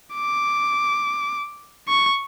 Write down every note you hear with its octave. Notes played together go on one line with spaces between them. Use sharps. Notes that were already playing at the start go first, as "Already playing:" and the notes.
D6
C#6